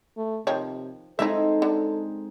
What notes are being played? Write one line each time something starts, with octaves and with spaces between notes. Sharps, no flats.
A3
C3 D#3 F3 C#5
G#3 C4 D#4 E4 A4 E5
D3